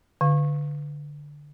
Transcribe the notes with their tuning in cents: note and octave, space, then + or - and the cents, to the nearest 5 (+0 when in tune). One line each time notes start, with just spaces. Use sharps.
D3 +0 F5 +0